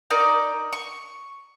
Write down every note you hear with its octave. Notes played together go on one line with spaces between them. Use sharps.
D#4 A#4 D5
C#6